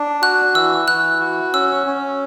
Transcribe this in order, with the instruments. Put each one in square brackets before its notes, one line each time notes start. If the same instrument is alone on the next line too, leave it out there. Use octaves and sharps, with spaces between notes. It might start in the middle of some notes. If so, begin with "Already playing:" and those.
Already playing: [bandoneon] D4
[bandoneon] F#4 [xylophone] F#6
[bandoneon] E3 [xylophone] E6
[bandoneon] E3 [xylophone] F#6
[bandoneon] F#4
[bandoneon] C#4 [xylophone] E6
[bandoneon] C#4